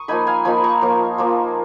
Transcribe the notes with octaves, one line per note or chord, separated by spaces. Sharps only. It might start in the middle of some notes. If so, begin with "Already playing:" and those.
Already playing: C#6 D#6
F3 A#3 D#4 G#5 B5
F5 G#5
F3 A#3 D#4 G#5 B5
A#5 C#6
F3 A#3 F4
F3 A#3 F4